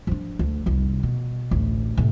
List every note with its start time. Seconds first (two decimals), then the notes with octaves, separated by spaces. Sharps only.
0.07 F3 D4
0.39 D2
0.66 F1 C2
1.03 B2
1.51 A1 D2
1.97 A1 C3